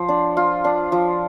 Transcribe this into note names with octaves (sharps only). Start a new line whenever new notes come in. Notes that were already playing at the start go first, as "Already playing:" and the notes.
Already playing: F3 C5
D4
F4
D4
F3